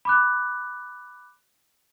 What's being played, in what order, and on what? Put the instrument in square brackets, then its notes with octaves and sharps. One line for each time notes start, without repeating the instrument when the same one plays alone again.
[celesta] B5 D6 F#6